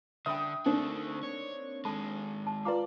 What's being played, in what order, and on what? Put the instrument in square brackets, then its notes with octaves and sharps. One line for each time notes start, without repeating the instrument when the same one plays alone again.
[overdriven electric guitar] D3 [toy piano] E5 B5 [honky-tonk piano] G5 D#6
[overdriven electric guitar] D3 A3 [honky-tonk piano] A#3 C4 D4 [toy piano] D#4
[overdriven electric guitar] C#5
[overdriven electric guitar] D#3 G#3 [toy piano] A4 A5 B5
[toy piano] A5
[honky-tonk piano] F4 D5 [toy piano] B4 A#5 D6